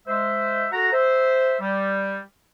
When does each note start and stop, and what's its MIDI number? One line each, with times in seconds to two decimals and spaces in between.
0.08 0.66 56
0.08 0.66 72
0.08 0.66 76
0.72 0.92 66
0.72 0.92 69
0.72 0.92 78
0.72 0.92 82
0.93 1.57 72
0.93 1.57 76
1.61 2.19 55